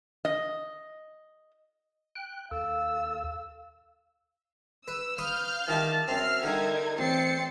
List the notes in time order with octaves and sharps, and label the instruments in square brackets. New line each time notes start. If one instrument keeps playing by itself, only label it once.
[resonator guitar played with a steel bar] D#5
[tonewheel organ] G5 F#6
[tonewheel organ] D#2 A4 [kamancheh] F5 E6
[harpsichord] B4 [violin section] E6
[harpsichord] B4 C#6 D#6 [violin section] F5 F6 G6
[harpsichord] D#3 E4 G4 [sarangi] A5
[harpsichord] F#2 C4 [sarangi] E5 [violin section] F6 C7
[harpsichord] D3 G3 [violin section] D#4 A#4 G#6
[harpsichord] A1 [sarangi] C4 [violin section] A6 C7 C#7